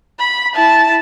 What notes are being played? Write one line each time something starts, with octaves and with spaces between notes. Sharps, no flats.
B5
E4 A5